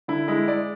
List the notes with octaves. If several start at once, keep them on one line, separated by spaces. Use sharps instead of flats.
D3 E4
G#3 E4
G#3 D5